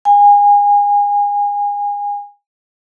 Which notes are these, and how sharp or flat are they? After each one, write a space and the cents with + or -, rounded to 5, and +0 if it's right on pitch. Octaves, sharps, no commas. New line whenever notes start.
G#5 -30